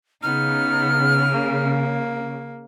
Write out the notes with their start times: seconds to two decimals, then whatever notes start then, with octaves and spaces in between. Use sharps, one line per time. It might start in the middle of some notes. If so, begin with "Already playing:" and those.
0.23 C#3 B3 D#4 F6
1.30 A#3